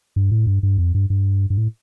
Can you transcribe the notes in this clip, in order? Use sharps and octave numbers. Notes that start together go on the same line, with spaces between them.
G2
A2
G2
G2
F2
G2
G2
G2
A2